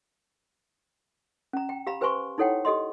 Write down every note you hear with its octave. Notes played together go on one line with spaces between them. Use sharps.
C#4 A#5
G5
G4 F5 A#5 B5
G4 B4 C5 G#5 C6 C#6
D#4 E4 A4 C#5 F#5 G5
G4 A4 D#5 C6